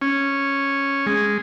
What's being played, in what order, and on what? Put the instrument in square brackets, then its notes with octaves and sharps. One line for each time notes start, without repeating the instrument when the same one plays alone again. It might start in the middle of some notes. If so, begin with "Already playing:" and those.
[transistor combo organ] C#4
G#3